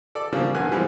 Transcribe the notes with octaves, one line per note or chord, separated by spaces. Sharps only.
A4 D5
C#3 F3 G3 A#3 C4 D4
B1 G2 A#4 G#5 F#6
E3 F3 G3 G#3 B3 C4